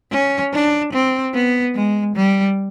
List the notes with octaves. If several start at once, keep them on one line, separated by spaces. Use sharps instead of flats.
C#4
D4
C4
B3
G#3
G3